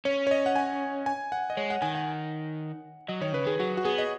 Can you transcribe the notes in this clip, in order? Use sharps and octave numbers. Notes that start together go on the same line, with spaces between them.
C#4 C#5
C#5
D#5
F#5
G#5
G#5
F#5
D#5
G#3 C#5
F#5
D#3 G#5
F#5
F#3 D#5
D#3 C#5
C#3 B4
D#3 G#4
F#3 F#4
F#4
B3 G#4
D#5